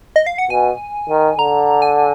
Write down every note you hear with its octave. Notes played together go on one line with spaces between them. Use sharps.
D#5
F5
F#5
B2 G#5
D#3
D3 A#5
G#5